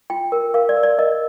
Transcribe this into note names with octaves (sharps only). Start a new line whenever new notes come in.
F4 G5
A#4
A#4 F5
D5
A#4
D5
A#4 D#5